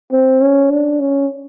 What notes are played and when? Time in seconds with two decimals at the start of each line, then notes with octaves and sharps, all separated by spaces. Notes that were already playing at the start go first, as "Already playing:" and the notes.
0.12 C4
0.41 C#4
0.70 D4
1.00 C#4